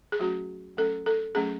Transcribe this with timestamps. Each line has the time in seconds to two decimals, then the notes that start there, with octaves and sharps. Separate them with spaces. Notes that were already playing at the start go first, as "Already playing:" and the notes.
0.12 G#4
0.19 F#3 A3 C#4 F#4
0.77 F#3 A3 C#4 A4
1.06 A4
1.35 F#3 A3 C#4 G#4